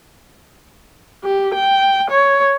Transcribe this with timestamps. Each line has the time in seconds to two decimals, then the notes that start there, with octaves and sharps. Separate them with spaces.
1.24 G4
1.55 G5
2.10 C#5